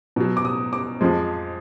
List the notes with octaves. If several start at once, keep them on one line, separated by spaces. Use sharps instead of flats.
B2 F#3
D6
D#6
D6
F2 F3 G#3